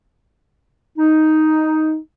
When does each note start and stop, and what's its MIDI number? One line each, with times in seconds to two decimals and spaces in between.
0.98 1.97 63